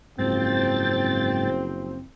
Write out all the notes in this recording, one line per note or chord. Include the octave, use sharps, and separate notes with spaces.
F#1 G#2 F3 C4 G5 A6